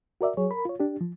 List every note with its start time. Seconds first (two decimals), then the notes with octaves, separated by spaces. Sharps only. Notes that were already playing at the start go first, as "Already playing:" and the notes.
0.21 F#4 A#4 D5 E5
0.37 F#3 G#4 C#5
0.51 A#4 B5
0.65 F4 C#5
0.80 D4 G4
1.01 F3